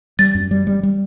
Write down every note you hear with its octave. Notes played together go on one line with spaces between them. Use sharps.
G3 A6
F#2
G3
G3
G3